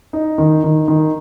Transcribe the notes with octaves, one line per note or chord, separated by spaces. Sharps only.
D#4
D#3
D#3
D#3